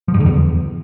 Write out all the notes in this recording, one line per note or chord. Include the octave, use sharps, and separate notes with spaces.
F3
G2
D3
E2